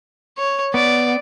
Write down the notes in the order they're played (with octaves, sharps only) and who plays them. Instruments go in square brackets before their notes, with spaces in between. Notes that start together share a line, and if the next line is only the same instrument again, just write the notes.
[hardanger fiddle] C#5
[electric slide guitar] B3 [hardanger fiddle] D5